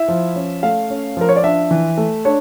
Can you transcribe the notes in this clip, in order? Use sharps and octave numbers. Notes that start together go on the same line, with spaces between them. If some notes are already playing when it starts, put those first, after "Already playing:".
Already playing: E4 E5
F3
C#4
A3 F5
C#4
F3 A#4
C#5
D5
D4 E5
E3
A3
D4 C#5